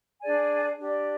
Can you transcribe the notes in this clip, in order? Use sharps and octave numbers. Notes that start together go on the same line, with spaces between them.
D4 G#4 D5 G#5
D4 G4 D5